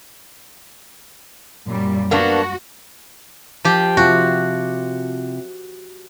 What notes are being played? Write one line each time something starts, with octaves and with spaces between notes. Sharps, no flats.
F#2 A#2 G3
A#3 B3 D4 F#4
F3 G4
C3 F3 F4 F#4